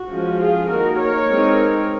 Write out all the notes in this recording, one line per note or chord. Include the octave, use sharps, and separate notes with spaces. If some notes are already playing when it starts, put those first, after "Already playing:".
Already playing: F#4
F3 G#3 C#4
F4 G#4
D#3 A#3 D#4 F#4 A#4
A#4 C#5
G#3 C4 D#4